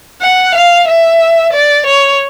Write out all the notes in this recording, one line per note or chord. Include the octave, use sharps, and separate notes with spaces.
F#5
F5
E5
D5
C#5